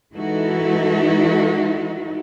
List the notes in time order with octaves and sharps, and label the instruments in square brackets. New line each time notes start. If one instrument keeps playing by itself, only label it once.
[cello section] E3 G#3 D#4 E4 F#4 A4